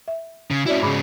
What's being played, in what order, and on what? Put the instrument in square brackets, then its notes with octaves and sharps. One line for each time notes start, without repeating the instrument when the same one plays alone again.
[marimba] E5
[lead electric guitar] C#3
[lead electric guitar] C#4 E4 [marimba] F#4 D5 E5
[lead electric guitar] G#2 C#3 [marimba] G#4 B5 D6